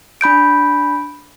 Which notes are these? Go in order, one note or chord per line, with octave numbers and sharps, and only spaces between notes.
D4 B5 G6 D7